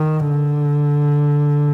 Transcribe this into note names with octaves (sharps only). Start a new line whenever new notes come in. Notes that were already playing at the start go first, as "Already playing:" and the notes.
Already playing: D#3
D3